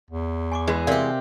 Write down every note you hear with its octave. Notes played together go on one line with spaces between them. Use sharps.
E2
G#5 C#6 D6
E3 G#3 G#4 B4
C3 G4 A#4 D5 F5